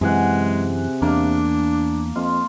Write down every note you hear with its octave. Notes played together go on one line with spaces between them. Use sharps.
F#2 C3 E3 G#3 G#4 F#5
E2 A#3 D4
F2 F4